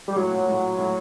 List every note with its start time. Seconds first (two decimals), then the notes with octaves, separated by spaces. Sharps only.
0.08 G3
0.16 A2 F#3
0.31 A#2
0.48 A2
0.78 A2